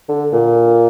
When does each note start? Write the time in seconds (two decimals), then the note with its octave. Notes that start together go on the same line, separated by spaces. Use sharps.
0.09 D3
0.32 A#2